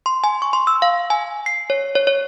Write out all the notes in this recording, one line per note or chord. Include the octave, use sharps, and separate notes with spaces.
C6
G#5
C#6
C6
E6
F5
G#5
C7
C#5
C#5
C#5